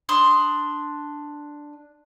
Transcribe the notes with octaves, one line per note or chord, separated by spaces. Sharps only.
D4 C6 D#6